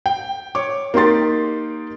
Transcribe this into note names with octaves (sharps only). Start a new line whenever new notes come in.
G5
C#5 D6
A#3 D#4 G4 C6 A6